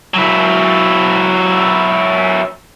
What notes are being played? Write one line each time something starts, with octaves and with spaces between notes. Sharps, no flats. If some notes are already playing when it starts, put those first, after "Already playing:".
F#3 E4